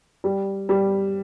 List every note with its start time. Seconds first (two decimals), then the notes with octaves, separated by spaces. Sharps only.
0.24 G3
0.69 G3